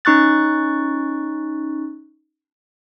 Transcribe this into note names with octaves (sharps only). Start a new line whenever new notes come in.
C#4 D#4 C#6 F#6 A6